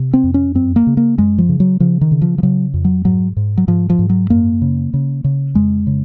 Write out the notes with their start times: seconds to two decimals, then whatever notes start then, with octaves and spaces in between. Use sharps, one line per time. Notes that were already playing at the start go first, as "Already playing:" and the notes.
Already playing: C3
0.13 C4
0.24 F2
0.34 C#4
0.55 F#2 C4
0.76 A#3
0.87 C#3
0.97 A#3
1.18 F#2 G#3
1.38 F3
1.49 C#3
1.60 F#3
1.80 C#3 F3
2.01 D#3
2.11 C#3
2.22 F3
2.38 F3
2.43 C#3 F#3
2.74 F2
2.85 F#3
3.05 G#2 F#3
3.37 G#2
3.58 F#3
3.68 G#2 F3
3.90 F3
3.99 G#2
4.10 F#3
4.30 F#2 A#3
4.62 C#3
4.94 C#3
5.24 C#3
5.55 F2 G#3
5.87 C#3